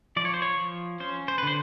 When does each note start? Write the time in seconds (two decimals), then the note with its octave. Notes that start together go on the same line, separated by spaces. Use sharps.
0.16 F3 D5
0.25 C#5
0.34 C5
0.42 C#5
0.58 F3
1.00 C#4 C5
1.28 C5
1.38 B4
1.43 D3 C5